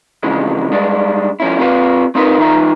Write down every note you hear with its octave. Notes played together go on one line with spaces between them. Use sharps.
F2 C#3 E3 F3 G#3
G2 G#3 D4
F3 C#4 E4
C4 F4 G#4 A#4 B4 F5
C4 D#4 F4 A#4 B4
E3 D#4 F4 E5 A#5